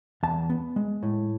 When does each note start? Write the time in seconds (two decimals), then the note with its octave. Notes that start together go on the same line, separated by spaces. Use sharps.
0.23 E2 A5
0.50 B3
0.76 G#3
1.03 A2